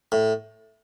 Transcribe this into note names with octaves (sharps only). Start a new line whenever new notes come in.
A2